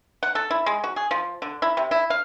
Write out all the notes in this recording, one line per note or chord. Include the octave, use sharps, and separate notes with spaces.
F#5
A4
E4
G#3
F#4
G#4
F3
D3
E4
C3
E4
F5